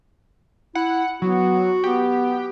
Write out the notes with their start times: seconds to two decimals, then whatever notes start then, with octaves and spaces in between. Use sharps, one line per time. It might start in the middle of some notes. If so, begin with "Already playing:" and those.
0.75 E4 F#5
1.22 F#3 B3 F#4
1.84 B3 G4